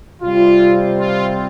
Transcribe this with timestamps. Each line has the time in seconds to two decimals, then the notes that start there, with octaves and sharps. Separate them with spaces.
0.22 C3 G3 C4 F4
1.01 F4